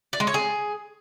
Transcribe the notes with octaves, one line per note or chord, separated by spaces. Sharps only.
D5
G#3
C#5
G#4